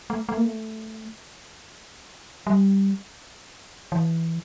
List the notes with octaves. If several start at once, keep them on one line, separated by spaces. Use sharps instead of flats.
A3
A3
A#3
A3
G3
E3